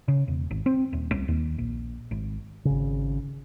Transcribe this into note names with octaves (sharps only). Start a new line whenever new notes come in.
C#3
E1
G#1
C4
D#1
C2
D#2
A#1
G#1
G#1 C#3